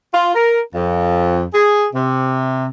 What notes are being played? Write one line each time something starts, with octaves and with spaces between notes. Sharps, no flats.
F4
A#4
F2
G#4
C3